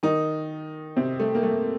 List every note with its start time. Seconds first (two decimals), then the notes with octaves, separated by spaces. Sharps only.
0.03 D#3 D#4
0.96 C3 C4
1.20 A3
1.35 A#3
1.43 A3